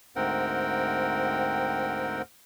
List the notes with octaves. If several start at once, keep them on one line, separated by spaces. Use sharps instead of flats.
D2 G#2 C4 A#4 F#5 G5